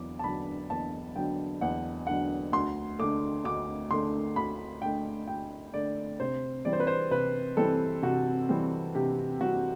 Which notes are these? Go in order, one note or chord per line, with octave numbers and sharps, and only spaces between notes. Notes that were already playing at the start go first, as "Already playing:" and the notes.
Already playing: E2 D3 F#3 D6
A5
D3 F#3 B5
E2 A5
D3 F#3 G5
E2 F#5
D3 F#3 F#5
D2 C6
D3 A3 D6
D2 D6
D3 A3 C6
D2 B5
D3 A3 G5
D2 G5
D3 A3 D5
C3 C5
E3 G3 C4 D5
C5
B4
C5
C3 B4
E3 G3 C4 A4
C3 F#4
E3 G3 C4
C3 G4
E3 G3 C4 F#4